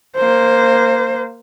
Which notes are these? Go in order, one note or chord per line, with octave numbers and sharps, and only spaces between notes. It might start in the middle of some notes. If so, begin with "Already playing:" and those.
A#3 C5